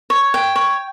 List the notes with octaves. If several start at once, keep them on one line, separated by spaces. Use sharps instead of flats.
C#5
G5
C#5